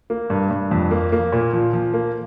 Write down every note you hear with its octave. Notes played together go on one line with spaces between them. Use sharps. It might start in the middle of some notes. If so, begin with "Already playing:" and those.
A#3
G2
G2
F2
A#3
A#3
A#2
F3
F3
A#3